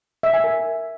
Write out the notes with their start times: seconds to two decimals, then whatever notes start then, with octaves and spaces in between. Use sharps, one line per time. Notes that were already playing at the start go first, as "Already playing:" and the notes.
0.23 E5
0.34 G#5
0.44 A#4